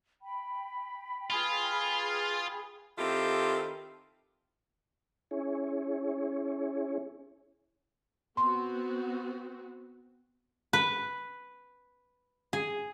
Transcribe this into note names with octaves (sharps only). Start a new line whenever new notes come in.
G5 B5
F4 G#4 B4
D#3 C4 E4 F4 G4 A4
C#4 E4 G#4 C#5
B3 C4 F#4 C6
B4
G#4